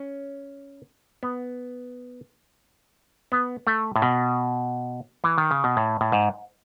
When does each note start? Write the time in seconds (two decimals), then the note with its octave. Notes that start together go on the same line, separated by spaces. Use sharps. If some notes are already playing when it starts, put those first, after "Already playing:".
Already playing: C#4
1.23 B3
3.32 B3
3.67 A3
3.96 A2
4.02 B2
5.24 E3
5.38 D#3
5.51 C#3
5.64 B2
5.77 A2
6.01 A2
6.12 G#2